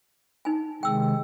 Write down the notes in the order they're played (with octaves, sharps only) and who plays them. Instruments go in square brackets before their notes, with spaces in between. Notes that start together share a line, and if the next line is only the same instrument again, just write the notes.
[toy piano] D#4 G#5
[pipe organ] C3 D#3 G#3 [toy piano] G5 E6